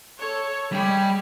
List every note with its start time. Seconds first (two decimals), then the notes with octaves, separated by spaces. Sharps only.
0.19 A4 C#5
0.72 G3 G#3 G4 G#5 B5